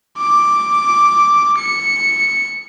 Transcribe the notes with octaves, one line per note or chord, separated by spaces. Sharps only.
D6
C#7